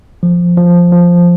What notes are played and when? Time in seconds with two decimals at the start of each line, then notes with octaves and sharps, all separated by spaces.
0.23 F3
0.57 F3
0.92 F3